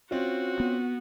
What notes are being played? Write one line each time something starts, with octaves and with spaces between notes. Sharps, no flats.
C4 C#4 F4 F#4
B3